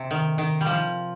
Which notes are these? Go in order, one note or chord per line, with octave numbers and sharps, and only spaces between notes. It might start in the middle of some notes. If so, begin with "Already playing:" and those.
Already playing: C3
D#3
D#3
G3
F3